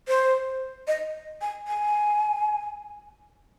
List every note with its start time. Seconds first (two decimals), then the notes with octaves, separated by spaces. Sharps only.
0.08 C5
0.88 D#5
1.41 G#5
1.68 G#5